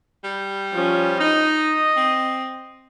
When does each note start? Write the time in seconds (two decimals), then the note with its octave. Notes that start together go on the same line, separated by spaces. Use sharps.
0.24 G3
0.73 F3 C#4
1.20 D#4 D#5
1.96 C4